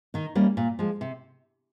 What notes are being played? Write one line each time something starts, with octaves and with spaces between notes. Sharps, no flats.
D#3 D#4
G3 A#3 C#4
A#2
F3 G#3
C3